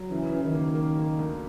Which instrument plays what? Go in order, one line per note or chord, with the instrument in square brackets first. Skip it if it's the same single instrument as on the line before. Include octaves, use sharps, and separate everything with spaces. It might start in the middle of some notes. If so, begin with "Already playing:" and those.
Already playing: [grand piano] F#3
[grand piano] C#3 [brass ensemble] E3
[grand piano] C#3
[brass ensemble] D#3
[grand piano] A#3
A#3
A#3
D2